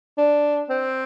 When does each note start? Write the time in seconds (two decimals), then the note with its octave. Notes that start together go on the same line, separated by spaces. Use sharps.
0.18 D4
0.70 C4